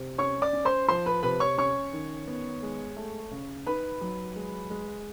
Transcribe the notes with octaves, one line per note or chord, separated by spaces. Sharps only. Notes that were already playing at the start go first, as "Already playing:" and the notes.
Already playing: C3
C#4 C#5 C#6
D5 D6
C#4
C5 C6
F3 C5 C6
B4 B5
C3 B4 B5
C#5 C#6
C#4 C#5 C#6
D#3
B3
G#3
A3
C#3
D#4 B4 B5
F#3
G#3
G#3